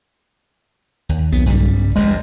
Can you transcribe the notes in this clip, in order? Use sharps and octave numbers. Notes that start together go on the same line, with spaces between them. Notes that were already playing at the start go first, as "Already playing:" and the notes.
D#2
B1 B3
G2 C#3 G3
F1 E2 G2 G#3